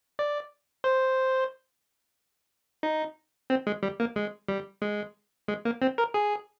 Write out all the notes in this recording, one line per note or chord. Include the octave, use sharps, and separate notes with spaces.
D5
C5
D#4
C4
G#3
G3
A#3
G#3
G3
G#3
G#3
A#3
C4
A#4
G#4